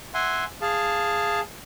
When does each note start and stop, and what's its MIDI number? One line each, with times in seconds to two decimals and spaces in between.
0.14 0.44 76
0.14 0.44 78
0.14 0.44 80
0.14 0.44 84
0.62 1.40 68
0.62 1.40 77
0.62 1.40 81